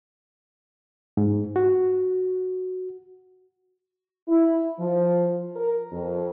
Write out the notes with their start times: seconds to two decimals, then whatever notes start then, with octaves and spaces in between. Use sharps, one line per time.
1.17 G#2
1.56 F#4
4.28 E4
4.78 F3
5.56 A#4
5.92 F2